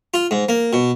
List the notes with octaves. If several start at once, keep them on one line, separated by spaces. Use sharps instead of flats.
F4
G#2
A#3
B2